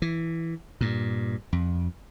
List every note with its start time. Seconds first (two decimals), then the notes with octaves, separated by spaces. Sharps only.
0.02 E3
0.81 G2 A#2
1.53 F2